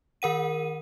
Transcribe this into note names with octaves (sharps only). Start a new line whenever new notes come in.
D#3 A#4 F#5 D#7